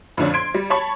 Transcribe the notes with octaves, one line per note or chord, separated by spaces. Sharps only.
F2 A2 D3 C#4 D4
C6 G#6 D7
G3
C#5 A5 B5 C#6